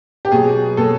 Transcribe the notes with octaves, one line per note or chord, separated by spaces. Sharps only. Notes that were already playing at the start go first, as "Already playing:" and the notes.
G4
B2 F#3 G#4
B2 A4
F#3